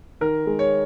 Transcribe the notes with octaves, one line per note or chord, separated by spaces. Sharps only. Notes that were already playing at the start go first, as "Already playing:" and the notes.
D#3 A#4
G#3
C#5